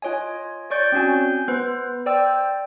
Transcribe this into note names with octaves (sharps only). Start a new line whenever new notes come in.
F4 C#5 D#5 G#5
C#5 D5 C#6 G6 A6 D7
C4 C#4 F#4 G#5
G6
B3 B4 C5
C5 D5 G5 E6